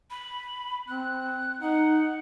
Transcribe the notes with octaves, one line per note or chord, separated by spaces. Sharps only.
B5
C4 F#6
D#4 F#5